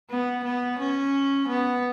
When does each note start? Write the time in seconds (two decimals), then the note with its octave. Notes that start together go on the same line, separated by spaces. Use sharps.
0.10 B3
0.45 B3
0.79 C#4
1.48 B3